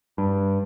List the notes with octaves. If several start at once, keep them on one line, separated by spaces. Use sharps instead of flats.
G2